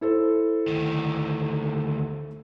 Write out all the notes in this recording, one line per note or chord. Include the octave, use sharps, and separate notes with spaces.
E4 A4 C5
D2 D#3